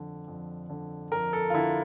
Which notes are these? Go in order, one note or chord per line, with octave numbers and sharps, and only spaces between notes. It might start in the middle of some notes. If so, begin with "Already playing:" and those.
Already playing: F2 D3
F2
D3
F2 A#4
A4
F4
D3 E4